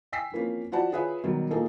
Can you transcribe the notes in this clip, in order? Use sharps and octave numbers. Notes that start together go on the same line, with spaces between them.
G5 G#5 E6 B6 C7
E3 F3 A#3 C4 C#4
F3 F#4 C5 D5 F#5 A5
F4 G#4 B4 C#5 E5
B2 D#3 F#3 G3
A#2 F3 A#3 D#4 G#4 A4